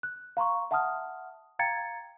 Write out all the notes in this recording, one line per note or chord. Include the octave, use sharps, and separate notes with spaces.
F#6
F5 A#5 C6 C#6
E5 F#5 A5 C6 D#6 F6
F5 G5 A#5 G#6 A6 C#7